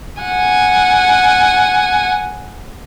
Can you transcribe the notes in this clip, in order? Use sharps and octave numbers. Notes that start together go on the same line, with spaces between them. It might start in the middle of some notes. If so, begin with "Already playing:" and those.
F#5 G#5